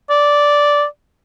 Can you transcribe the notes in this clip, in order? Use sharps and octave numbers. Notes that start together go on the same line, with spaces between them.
D5